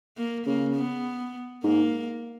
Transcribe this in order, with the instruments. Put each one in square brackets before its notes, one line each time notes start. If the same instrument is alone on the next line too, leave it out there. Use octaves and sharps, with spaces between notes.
[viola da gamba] A#3
[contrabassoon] C#3 [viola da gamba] A#3
[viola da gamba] B3
[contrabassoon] G#2 [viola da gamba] A#3